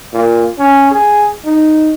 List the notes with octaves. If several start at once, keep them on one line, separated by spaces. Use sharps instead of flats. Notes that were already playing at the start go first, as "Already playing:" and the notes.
A#2
C#4
G#4
D#4